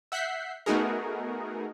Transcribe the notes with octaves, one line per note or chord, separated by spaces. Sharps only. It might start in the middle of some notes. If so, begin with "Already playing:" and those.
E5 F#5 F#6 G6 B6 C7
A3 B3 D#4 F#4 G#4 A#4